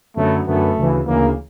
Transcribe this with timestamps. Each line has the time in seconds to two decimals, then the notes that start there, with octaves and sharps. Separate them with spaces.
0.16 F#2 D3 F#3 A3 B3
0.47 F#2 D3 F#3 A3 B3
0.76 D2 C#3 E3
1.06 D2 C#3 E3 A#3